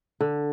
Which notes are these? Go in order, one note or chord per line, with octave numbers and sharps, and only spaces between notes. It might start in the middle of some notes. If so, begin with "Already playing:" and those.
D3